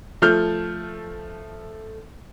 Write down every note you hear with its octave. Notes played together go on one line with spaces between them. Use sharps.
F3 A3 F6 G6